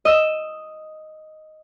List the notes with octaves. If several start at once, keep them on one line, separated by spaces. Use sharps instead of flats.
D#5 E6